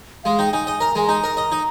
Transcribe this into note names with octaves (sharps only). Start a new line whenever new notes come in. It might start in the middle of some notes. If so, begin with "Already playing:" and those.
G#3 F5
D#4 G5
D#4 G#5
D#5 G#5
A#4 A#5
G#3 G#5
D#4 A#5
A#4
D#5
D#4